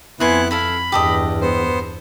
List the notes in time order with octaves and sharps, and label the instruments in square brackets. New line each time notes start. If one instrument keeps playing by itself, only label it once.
[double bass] F2 [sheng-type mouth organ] B3 E4 F#6 [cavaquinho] C5 G#5 C6
[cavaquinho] E4 A4 F5 [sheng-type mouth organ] B5
[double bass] E2 G2 [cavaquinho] G4 A4 D#5
[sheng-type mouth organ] B3 C5